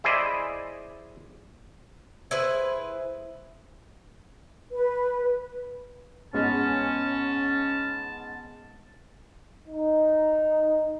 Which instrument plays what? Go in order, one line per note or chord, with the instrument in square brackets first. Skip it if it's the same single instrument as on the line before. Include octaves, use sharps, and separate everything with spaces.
[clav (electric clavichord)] E4 G#4 C5 D5 D#5
[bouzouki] E4 G#4 B4 [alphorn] C5
[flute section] B4
[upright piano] G#2 G#3 B3 [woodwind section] C#4 [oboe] A5
[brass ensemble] D#4